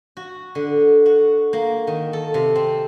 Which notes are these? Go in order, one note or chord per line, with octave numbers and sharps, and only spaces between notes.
F#4
D3
F#4
A#3
D#3
A4
C3
C4